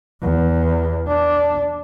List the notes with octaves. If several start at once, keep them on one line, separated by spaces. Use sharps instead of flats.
E2
D4